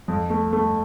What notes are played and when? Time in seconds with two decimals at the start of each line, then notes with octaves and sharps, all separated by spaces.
0.08 F2
0.30 A3
0.53 A3